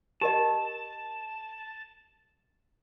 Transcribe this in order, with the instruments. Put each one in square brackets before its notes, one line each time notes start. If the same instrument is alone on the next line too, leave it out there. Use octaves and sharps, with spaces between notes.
[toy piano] G4 A#4 D#5 [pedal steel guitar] A5